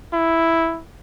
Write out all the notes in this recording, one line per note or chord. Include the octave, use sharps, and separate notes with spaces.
E4